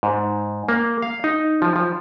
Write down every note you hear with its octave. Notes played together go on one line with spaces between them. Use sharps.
G#2
A#3
F5
D#4
F3
F3